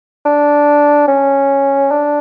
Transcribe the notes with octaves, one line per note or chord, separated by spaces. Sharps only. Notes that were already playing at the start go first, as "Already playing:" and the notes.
D4
C#4
D4